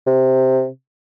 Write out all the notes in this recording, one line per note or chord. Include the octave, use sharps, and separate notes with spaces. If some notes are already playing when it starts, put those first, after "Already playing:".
C3